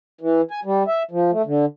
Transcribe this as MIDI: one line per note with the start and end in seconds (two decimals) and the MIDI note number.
0.21 0.41 52
0.51 0.60 80
0.65 0.83 55
0.88 1.03 76
1.11 1.31 53
1.32 1.42 57
1.46 1.65 50